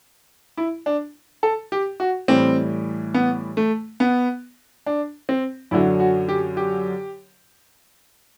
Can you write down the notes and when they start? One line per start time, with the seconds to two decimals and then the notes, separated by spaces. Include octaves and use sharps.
0.57 E4
0.86 D4
1.43 A4
1.72 G4
2.00 F#4
2.28 A2 E3 G3 C4
3.14 B3
3.57 A3
4.00 B3
4.86 D4
5.29 C4
5.71 F#2 D3 F#3 E4
6.00 F#4
6.29 G4
6.57 G4